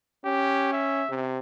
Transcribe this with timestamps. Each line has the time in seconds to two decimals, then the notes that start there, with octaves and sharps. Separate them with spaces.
0.25 C#4 G4
0.73 E5
1.10 C3